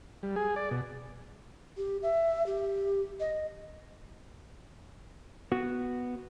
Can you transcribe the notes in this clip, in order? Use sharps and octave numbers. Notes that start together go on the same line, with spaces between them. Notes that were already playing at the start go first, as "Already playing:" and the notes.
G3
G#4
D5
B2
G4
E5
G4
D#5
B3 F#4